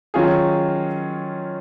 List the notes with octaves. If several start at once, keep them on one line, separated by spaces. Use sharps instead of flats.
D#3 F#3 C#4 F4 G#4